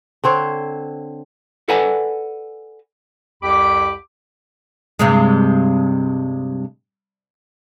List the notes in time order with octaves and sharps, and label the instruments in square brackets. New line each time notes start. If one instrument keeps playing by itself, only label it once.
[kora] D3 C4 C5 C#5
[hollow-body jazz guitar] A4 B4 D5 F#5 G#5 A#5
[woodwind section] C2 F2 G4 B5 D6
[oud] G2 C3 G#3